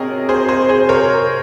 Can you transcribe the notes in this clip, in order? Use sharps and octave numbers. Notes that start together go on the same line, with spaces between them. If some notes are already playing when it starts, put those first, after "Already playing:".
Already playing: C3 G#4 A#4 C#5 D#5 G5
G#4 C5
G#4 C5
G#4 C5
A#4 C#5